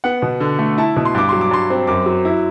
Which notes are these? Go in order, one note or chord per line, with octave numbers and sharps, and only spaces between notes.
B3 F#5
B2
D3
A3
E4 A5
B2
C6
G2 D6
F#3 C6
D6
G2 C6
C4
F#2 D6
F#3
E4